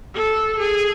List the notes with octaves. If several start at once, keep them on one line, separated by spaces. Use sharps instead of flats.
A4
G#4